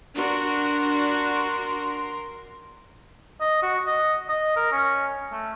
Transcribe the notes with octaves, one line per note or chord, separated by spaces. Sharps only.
D4 F#4 A#4 C6
D#5
F#4
D#5
D#5
A#4
C#4
A3